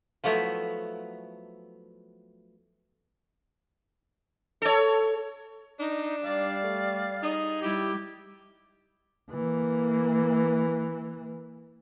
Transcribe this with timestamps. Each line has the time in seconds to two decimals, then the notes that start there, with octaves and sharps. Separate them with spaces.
0.24 F3 F#3 A3 B3 E4
4.62 A4 C#5
5.79 D4 D#4
6.24 G3 G4 D5 F5
6.63 A3
7.23 D#4 G#4
7.62 G3 E4 G4
9.31 E3 A#3